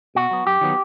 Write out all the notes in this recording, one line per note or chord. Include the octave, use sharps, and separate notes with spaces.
B2 F#4
F#3 B3
F#2 G4
D#3 F#3 B3